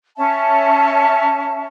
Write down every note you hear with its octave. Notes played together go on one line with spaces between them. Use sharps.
C#4 E5 A5